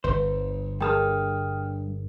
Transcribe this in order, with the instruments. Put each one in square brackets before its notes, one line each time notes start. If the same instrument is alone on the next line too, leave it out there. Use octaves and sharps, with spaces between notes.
[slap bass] G1 [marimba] B4 [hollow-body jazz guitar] C5
[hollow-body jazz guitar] G2 A5 [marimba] G#4 A#4 [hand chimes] G5 D#6 F6